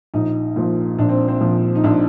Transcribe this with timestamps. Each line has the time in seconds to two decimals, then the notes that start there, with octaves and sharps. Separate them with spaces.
0.14 A#1 D#4
0.56 A#2 F3
0.98 A#1 D4
1.09 C4
1.28 C4
1.41 A#2 F3
1.75 D#4
1.84 A#1 D4